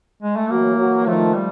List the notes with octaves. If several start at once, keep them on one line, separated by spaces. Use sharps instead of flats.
G#3
A3
E3 F#3 A#3
E3 F#3
D#3 F3 A3
G3